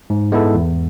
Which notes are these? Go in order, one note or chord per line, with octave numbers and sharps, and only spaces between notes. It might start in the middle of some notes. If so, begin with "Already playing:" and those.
G#2
G#3 B3 E4 A4
E2